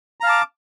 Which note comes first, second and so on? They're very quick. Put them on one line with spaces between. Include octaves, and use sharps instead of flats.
A#5 F5 A5 D6